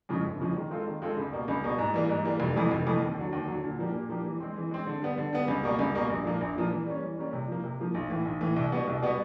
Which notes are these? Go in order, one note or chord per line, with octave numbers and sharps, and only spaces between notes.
F2 C#3 F3 G#3
G1
F2 C#3 F3 G#3
D#3
G#3 C4 F4 A4
D#3
G#3 C4 F4 A4
C#2
B2 G3 A#3
C#2
B2 G3 A#3
G#2
E3 G3 A#3
G#2
E3 G3 A#3
F1
F2 C3 E3 A3
F1
F2 C3 E3 A3
D#2
D3 F#3
D#2
D3 F#3
A#2
F3 A#3 D4 G4
A#2
F3 A#3 D4 G4
E3
G#3 C4
E3
G#3 C4
D3
G3 B3
D3
G3 B3
C#2
B2 G3 A#3
C#2
B2 G3 A#3
A#1
A#2 F3 A#3 D4
A#1
A#2 F3 A#3 D4
E3
G3 A#3 C#4
E3
G3 A#3 C#4
C3
F3 A#3
C3
F3 A#3
B1
A2 E3
B1
A2 E3
C2
B2 G3 B3
C2
B2 G3 B3